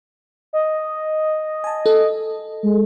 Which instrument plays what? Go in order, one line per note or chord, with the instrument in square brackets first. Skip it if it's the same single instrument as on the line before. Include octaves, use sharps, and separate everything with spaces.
[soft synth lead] D#5
[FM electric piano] G#5 A5
A4
[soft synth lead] G#3